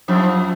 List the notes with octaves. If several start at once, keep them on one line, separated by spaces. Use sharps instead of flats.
F2 F3